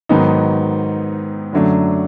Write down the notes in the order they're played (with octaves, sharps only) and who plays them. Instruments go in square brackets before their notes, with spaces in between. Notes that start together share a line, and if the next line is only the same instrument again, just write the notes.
[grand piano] G#2 D#3 F#3 B3 D#4
F#2 D3 F#3 A3 D4